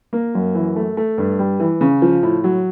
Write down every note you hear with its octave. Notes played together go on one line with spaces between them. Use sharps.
A#3
F#2
E3
A3
A3
G2
G3
E3
C#3
F3
A2
F#3